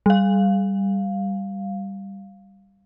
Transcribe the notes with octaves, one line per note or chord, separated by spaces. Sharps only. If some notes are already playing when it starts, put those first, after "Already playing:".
G3 F5